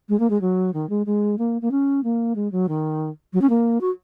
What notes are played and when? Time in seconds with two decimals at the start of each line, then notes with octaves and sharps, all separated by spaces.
0.09 G#3
0.20 A#3
0.30 G#3
0.41 F#3
0.74 D#3
0.89 G#3
1.06 G#3
1.38 A#3
1.62 A#3
1.71 C#4
2.04 A#3
2.36 G#3
2.52 F#3
2.68 D#3
3.33 F#3
3.41 C#4
3.50 A#3
3.81 F#4